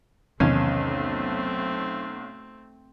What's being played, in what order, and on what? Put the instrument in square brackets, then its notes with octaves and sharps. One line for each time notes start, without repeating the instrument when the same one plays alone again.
[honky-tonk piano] B1 [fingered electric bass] E2 C3 D#3 [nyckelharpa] A3 C4 [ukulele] C#4